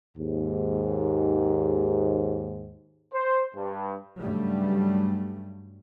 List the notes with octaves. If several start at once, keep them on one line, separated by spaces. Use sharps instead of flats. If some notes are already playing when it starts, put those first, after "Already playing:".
D#2 G#2
C5
G2
G2 C#3 F#3 G3 A3